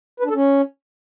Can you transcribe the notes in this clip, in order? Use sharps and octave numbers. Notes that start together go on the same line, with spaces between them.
B4
D4
A4
C#4